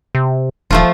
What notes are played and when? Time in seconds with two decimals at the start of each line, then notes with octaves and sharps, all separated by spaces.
0.15 C3
0.71 D#1 F3 A3 F4